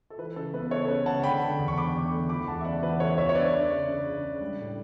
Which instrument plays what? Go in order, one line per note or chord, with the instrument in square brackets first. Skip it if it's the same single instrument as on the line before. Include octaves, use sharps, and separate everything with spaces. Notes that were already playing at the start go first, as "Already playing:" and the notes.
[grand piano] A4
E3 B4
C#3 A4
B3 B4
C#3 A4 C#5
A4
C#3 B4
C#3 F#5 A5
D3 G5 B5
D3
E2
C#6
D3 B5 D6
D3
A3
E3 B5 D6
E2 F#5 A5
E5
C#3 D5 F#5
E3 B4
E3 A4 C#5
E2 C#5 E5
C#5
D4 B4 D5
D4
C#3
C#3
C#3
D4
G3
A2